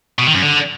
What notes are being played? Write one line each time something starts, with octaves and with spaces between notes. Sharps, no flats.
B2
D#3
F#2
D3